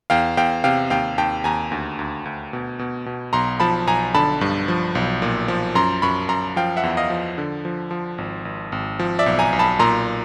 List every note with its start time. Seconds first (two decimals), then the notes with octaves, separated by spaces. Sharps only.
0.10 E2 F5 G5
0.37 E2 F5 G5
0.64 C3 F5 G5
0.90 D#2 F5 G5
1.18 D#2 G5 A5
1.44 D#2 G#5 A#5
1.71 D2
1.99 D2
2.25 D2
2.53 B2
2.79 B2
3.06 B2
3.33 B1 A#5 C6
3.60 F3 A5 B5
3.87 B1 G#5 A#5
4.15 D3 A5 B5
4.41 G2
4.68 F3
4.95 B1
5.22 A#2
5.48 F3
5.75 F#2 A#5 C6
6.02 F#2 B5 C#6
6.29 F#2 A#5 C6
6.56 F3 F5 G5
6.77 E5 F#5
6.83 E2
6.97 D#5 F5
7.10 F3
7.38 D3
7.65 F3
7.91 F3
8.18 G#1
8.45 G#1
8.72 G#1
8.99 F3
9.19 D5 E5
9.26 B1
9.39 G#5 A#5
9.53 B1
9.59 A5 B5
9.79 A#2 A#5 C6